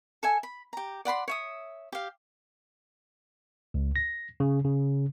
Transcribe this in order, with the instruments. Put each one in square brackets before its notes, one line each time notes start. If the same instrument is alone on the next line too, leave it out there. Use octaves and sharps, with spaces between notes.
[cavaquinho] A4 E5 G#5
B5
G4 A#5
D5 F#5 B5 C6
C#5 E5 D#6
G4 F5
[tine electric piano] C#2
A#6
C#3
C#3